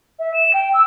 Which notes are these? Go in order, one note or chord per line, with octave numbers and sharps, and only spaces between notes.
E5
E7
G5
E6